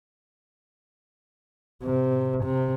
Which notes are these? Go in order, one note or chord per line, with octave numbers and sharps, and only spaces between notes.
C3
C3